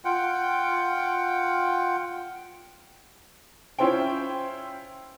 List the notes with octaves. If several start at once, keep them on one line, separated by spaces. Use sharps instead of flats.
F4 F#5 G5
C#4 E4 F4 C5 G5